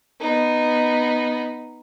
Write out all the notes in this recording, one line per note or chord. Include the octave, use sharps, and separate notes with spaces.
B3 D#4